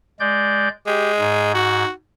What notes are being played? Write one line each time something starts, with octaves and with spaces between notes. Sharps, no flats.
G#3 D5 G6
G#3 G4
G#2
F#4